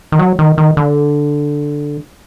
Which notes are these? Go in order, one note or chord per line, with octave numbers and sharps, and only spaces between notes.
D#3
F#3
D#3
D#3
D3